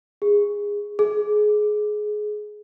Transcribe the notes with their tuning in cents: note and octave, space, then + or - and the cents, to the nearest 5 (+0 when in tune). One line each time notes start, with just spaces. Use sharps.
G#4 -15
G#4 +20